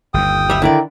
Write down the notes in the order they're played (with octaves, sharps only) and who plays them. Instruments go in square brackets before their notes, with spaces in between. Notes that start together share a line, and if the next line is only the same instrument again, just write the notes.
[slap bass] G1 D#2 [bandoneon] G5 D#6
[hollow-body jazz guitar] G3 E5
[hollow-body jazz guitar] D3 E4 D5 [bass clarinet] D#3